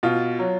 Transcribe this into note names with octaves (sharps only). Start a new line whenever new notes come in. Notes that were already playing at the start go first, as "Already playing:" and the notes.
B2 F4
F#3